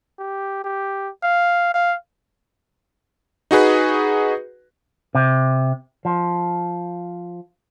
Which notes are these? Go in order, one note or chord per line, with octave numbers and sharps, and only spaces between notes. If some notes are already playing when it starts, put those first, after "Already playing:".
G4
G4
F5
F5
D#4 F#4 G#4 B4
C3
F3